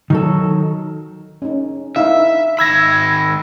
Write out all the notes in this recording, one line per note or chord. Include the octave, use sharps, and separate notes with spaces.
D#3 F#3 A4
C#4 D#4
D#4 E4 E5 F5
D#3 B5 E6 G#6 A#6